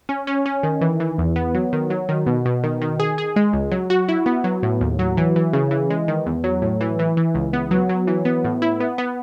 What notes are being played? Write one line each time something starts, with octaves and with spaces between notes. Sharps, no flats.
C#4
C#4
C#4
D#3
E3
E3
E2
B3
F#3
D#3
F#3
D#3
B2
B2
D#3
D#3
G#4
G#4
G#3
C#2
F#3
F#4
E4
B3
F#3
A2
D#2
F#3
E3
E3
C#3
E3
G#3
D#3
E2
F#3
A2
E3
E3
E3
C#2
B3
F#3
F#3
E3
B3
A2
E4
B3
B3